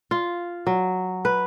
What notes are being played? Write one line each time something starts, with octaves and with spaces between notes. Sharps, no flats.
F4
F#3
B4